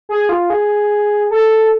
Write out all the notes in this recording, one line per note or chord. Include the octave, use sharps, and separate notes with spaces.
G#4
F4
G#4
A4